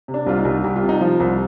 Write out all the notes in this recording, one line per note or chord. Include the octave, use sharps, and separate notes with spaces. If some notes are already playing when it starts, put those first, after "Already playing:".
C3
D4
C2 F4
D#4
C2
C2 G4
F4
C3
D#4
F3 F4
C2